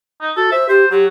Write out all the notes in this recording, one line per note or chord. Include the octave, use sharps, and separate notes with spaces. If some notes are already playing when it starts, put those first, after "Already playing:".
D#4
F#4 A4
C5 E5
G4 C5
F#3 G4